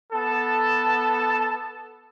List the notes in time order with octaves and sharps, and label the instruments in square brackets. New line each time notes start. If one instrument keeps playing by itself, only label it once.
[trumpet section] B3 A4 A5